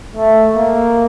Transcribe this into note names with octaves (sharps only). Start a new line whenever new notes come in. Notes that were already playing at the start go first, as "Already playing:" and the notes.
A3
A#3